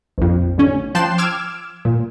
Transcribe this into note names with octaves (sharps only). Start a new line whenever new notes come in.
A#1 F2
A1 D3 C#4
F3 G5 A5 C6 F#6 E7
D6 E6 F6 G#6 D7 E7
A#2